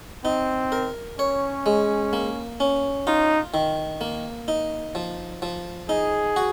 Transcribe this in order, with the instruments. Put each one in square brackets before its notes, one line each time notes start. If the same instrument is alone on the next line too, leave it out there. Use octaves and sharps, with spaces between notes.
[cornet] C4 [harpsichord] D#4
[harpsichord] A#4
[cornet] C#4 [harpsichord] C#5
[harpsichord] G#3
A#3
C#4
[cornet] D#4 [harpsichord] F4
[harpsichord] D#3
A#3
D#4
F3
F3
[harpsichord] D#4 [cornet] G#4
[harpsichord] F#4